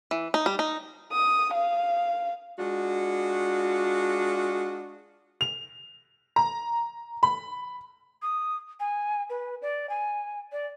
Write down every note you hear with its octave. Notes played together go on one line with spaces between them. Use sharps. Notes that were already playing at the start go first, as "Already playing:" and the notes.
E3
D#4
G3
D#4
D#6
F5
G#3 D4 F4 F#4
F7
A#5
B5
D#6
G#5
B4
D5
G#5
D5